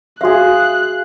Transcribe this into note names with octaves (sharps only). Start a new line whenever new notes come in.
F#4 G#4 E5 F5 F#6